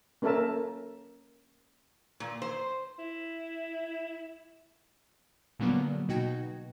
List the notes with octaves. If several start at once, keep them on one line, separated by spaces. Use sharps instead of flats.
A#3 C#4 A4 A#4 E5 A5
A#2
C5
E4
A#2 D3 F#3 G3 A#3 B3
B2 D#4 F#4 G5 G#6 A#6